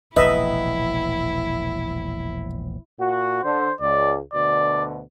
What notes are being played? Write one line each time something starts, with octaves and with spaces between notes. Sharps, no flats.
E1 A#1 A2 E4 B4 D#5 E5
A#2 F#4
D3 C5
C#2 D5
D2 B2 D3 D5